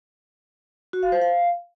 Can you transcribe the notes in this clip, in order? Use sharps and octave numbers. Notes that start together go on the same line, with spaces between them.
F#4
F5
C5
F5